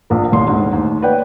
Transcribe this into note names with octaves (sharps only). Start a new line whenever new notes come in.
A#1 F3 A#4
D#1 C2 C6
D2 G#2
D#2
B4 C#5 D5 F#5 G5